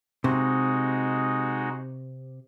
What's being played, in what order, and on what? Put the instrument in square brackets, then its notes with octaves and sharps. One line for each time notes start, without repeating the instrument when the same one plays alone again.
[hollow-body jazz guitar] C3 [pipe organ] G#3 D#4 F#4